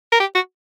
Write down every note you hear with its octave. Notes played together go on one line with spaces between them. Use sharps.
A#4
G4
F#4